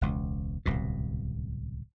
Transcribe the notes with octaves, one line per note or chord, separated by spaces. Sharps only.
E1 C#2
D1 C2 B2